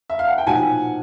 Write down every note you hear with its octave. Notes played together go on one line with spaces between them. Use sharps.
E5
F5
F#5
G5
B1 A#2 F3 F#5 G#5